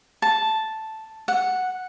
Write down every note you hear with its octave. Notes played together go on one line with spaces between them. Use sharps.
A5
F#5